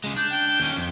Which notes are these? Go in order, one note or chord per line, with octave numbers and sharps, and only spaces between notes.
C#3 G#3
D4 G6
G5
D#2 C#4
F2